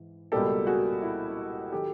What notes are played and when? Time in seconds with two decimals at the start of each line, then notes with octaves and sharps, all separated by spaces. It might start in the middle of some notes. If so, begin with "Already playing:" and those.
Already playing: G#2 E3
0.32 C#2 B2 G3 A#3 G4 A4
0.66 F#4 G#4
1.02 E4
1.72 D#3 F#3 G4 A4